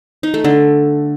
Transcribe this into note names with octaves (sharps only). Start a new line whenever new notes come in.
D#4
A3
D3